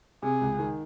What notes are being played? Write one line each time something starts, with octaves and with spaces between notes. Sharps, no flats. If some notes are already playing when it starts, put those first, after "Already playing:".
C3 G#4
C#2
D#3